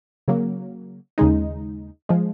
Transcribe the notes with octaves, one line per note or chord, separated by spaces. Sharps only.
C#3 F#3 A#3
D#2 C#3 G#3 D#4
F3 G#3